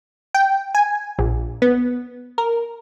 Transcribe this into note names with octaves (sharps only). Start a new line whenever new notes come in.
G5
G#5
A#1
B3
A#4